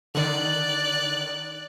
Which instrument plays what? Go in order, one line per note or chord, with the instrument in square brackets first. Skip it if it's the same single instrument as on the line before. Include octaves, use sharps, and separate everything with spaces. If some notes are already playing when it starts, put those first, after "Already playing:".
[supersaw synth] D3 D#3 [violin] D5 F#6